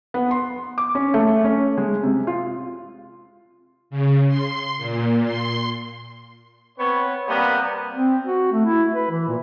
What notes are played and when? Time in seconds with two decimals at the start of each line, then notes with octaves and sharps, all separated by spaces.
0.14 B3
0.31 C6
0.78 D6
0.95 C#4
1.14 A3
1.44 C#4
1.78 G#3
2.03 C3
2.27 F4
3.90 C#3
4.28 C6
4.77 A#2
5.24 C6
6.78 B3 C4 B4 C#5
7.27 C3 G3 A#3 B3
7.94 C4
8.26 F#4
8.52 A3
8.65 E4
8.94 B4
9.11 E3
9.28 A#2